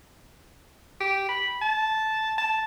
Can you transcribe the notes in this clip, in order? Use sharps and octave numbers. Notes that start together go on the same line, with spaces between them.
G4
B5
A5
A5